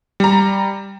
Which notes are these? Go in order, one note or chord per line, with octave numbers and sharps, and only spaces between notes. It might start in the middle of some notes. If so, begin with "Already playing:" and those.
G3 A#5